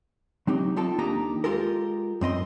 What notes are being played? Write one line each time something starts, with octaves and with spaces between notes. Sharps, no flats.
F#3 C4 D#4 G4
C4 D#4 F4 A4 G5 A5
D#2 A#3 D4 D#4 G4 A#5
G#3 F4 G4 A4 A#4
F#2 C4 D#5 C6